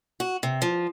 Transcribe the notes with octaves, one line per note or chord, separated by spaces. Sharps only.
F#4
C3
F3